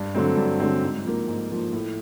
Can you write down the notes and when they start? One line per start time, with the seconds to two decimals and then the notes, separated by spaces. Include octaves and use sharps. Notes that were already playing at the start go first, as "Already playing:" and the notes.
Already playing: G2
0.14 D3 F#3 A3 C4
0.36 G2
0.60 D3 F#3 A3 C4
0.82 G#2
1.05 F3 A#3
1.28 G#2
1.50 F3 A#3
1.73 A2